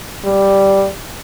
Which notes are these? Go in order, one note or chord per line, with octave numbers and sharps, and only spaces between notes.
G3